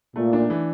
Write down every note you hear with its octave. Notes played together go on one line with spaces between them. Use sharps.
A#2 A3
D4
E3